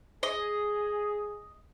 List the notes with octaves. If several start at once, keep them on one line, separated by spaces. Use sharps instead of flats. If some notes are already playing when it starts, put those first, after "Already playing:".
G#4 D#5